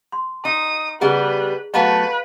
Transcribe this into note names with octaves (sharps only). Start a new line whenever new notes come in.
C6
D#4 D#6
C#3 G3 B3 G#4 B4 D#5 A#5
F#3 A3 B3 B4 D#5 F5 A#5